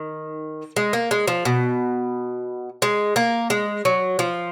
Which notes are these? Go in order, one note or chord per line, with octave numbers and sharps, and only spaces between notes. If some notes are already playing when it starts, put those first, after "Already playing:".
Already playing: D#3
G#3
A#3
G#3
F3
B2
G#3
A#3
G#3
F#3
F3